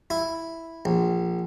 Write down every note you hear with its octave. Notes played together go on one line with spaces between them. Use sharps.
E4
A#1